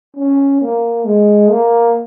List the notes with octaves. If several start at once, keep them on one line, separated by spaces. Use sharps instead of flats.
C#4
A#3
G#3
A#3